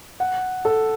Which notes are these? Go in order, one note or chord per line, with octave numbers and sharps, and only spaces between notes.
F#5
A4